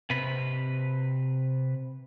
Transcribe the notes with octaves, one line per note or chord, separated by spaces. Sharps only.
C3 B4